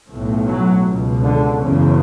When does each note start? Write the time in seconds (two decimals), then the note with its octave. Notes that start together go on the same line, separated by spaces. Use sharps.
0.11 B1 A2
0.48 F#3
0.85 C#2 B2
1.23 D3
1.60 F#1 E2 C#3